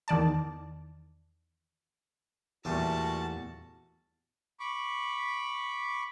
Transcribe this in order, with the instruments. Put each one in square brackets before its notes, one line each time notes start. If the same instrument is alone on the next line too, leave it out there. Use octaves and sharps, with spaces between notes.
[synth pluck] E2 D#3 D5 A5
[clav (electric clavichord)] E2 [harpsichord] A#2 G3 A3 [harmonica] F#4 [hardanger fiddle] A5
[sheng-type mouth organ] B5 C#6 D6